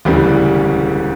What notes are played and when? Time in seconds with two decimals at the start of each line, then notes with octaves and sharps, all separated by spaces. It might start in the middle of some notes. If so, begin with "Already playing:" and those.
0.05 E1 D2 C#3 E3 G3